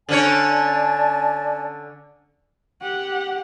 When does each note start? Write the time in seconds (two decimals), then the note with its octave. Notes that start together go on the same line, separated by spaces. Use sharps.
0.09 D3 C#4 C#5 D5 G#5 A5
2.82 G4 F#5